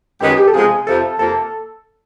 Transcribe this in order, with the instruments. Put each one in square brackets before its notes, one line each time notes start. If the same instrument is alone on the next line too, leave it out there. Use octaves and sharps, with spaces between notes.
[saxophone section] F#2 D#3 G#3 B3 [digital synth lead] G4
[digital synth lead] G#4
G4
A4
[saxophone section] C3 F3 G#3 B3 [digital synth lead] G#4
[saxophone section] F2 C3 F3 [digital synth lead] A4
[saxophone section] F2 C3 F3 A#3 [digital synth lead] A4